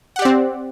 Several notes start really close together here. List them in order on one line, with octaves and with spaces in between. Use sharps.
F#5 G4 D5 C4